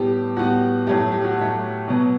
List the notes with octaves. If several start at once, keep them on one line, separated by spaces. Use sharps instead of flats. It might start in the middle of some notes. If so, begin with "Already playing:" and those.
Already playing: A2 G3 B3 G4
A2 G3 B3 F#4
A2 F#3 A3 G4
G4
F#4
A2 F#3 A3
B2 F#3 B3